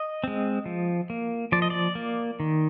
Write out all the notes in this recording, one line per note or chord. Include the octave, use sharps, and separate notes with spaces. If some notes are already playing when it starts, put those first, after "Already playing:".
Already playing: D#5
G#3 C4
F3
A#3
F3 D5
D#5
D5
A#3
D#3